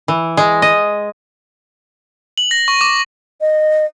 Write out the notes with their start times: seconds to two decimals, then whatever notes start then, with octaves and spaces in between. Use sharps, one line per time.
0.08 E3
0.37 G#3
0.62 D#5
2.38 F#7
2.51 A#6
2.68 C#6
2.81 D6
3.41 D#5